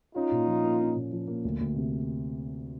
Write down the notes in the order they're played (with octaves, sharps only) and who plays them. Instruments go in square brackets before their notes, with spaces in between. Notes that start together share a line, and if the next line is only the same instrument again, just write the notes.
[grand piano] C#4 [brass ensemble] D#4 F4
[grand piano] A#2
F3
A#3
C#4
A#2
F3
A#3
D2
D2
C3